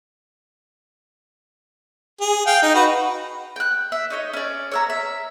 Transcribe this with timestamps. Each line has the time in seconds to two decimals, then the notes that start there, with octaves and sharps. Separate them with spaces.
2.21 G#4
2.46 F5 G5
2.63 D#4
2.75 F#4 B4
3.56 G5 F#6
3.92 E5
4.10 D#4 C#5 D#5
4.34 C#4 D5
4.72 C#5 E5 A#5
4.90 E5